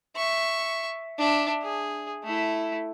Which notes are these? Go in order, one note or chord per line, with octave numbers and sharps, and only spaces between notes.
E5 C#6
D4 E5
G#4
A3 E4